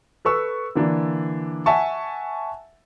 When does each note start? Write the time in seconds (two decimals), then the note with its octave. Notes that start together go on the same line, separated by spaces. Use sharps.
0.25 A4 B4 C#6 E6
0.75 D3 E3 A#3 D4
1.66 E5 F#5 G#5 A5 C#6